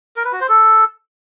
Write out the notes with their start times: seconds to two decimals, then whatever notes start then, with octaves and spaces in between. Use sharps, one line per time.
0.16 A#4
0.25 B4
0.33 F#4
0.41 C5
0.49 A4